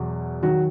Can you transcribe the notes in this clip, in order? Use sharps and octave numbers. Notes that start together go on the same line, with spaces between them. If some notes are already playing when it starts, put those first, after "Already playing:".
Already playing: E2 B2 F#3
D#3 F#3 F#4